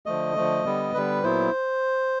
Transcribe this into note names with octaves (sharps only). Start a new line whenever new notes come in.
D3 F3 A3 D#5
D3 F3 A3
D3 G3 B3
D3 G3 B3 B4
A#2 F#3 B3 E4 C5